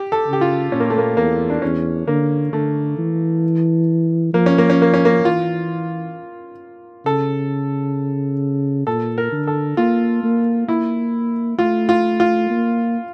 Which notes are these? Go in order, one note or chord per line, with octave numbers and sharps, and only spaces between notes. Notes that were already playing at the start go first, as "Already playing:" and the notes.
Already playing: G4
A4
C#3
G4
F4
A#2 C#4
A#3
A3
A#3
E2 A#3
D4
E2 C#4
D3 A#3
D3 A3
E3
F3 A#3
C#4
A#3
C#4
A#3
C#4
A#3
E3 F4
C#3 A4
A#2 A4
A#4
D3
A4
A#3 F4
A#3
A#3 E4
A3 F4
F4
F4
A#3